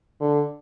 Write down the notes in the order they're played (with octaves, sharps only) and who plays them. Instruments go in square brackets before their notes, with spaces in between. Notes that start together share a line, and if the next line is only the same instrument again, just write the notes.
[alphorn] D3